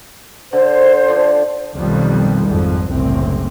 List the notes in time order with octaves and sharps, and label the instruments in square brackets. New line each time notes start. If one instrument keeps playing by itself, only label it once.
[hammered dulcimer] D3 [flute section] C5
[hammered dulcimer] D3 F3
[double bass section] B1 F2 D#3 G3
G#1 F2
F#1 C2 A2 C4